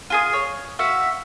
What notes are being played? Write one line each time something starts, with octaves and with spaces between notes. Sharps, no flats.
F4 G#4 D#6
C#5
F#4 E5 F5